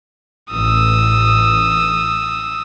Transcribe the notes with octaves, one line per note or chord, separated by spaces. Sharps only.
A1 D#6 E6